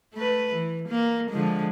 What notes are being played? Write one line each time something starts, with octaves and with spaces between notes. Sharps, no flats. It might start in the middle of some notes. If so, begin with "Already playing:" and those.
A3 B4
E3
A#3
D3 F3 G#3